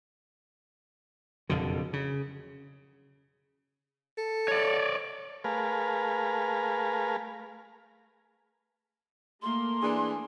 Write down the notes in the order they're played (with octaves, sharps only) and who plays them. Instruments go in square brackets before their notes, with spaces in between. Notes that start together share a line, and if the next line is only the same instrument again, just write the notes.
[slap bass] F#1 F2 B2 D3
C#3
[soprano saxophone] A4
[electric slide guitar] C#5 D5
[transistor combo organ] A3 G#4 A#4 B4 F5
[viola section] A3 A#3 [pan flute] C6
[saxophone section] E3 D4 G#4